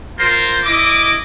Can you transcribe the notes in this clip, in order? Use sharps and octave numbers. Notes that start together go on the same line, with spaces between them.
F4 A#4 C5 C6
E4 D#5 D6